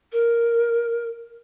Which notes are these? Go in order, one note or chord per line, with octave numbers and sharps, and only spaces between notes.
A#4